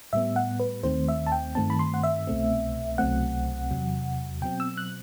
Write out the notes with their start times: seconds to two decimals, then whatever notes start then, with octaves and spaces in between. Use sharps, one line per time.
0.13 A2 G3 B3 E5
0.36 F#5
0.60 B4
0.83 D#2 D#3 A3 C4 C5
1.08 E5
1.27 A5
1.32 G5
1.55 G2 D#3 A3 C4 A5
1.70 B5
1.79 C6
1.94 F#5
2.04 E5
2.27 C2 B2 A3 C4
2.98 C2 B2 F#3 A3 C4 F#5
3.71 E2 C3 F#3
4.42 B2 F#3 C4 G5
4.60 E6
4.78 F#6